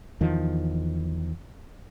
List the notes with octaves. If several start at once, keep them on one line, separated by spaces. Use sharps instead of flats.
E2 D#3 F3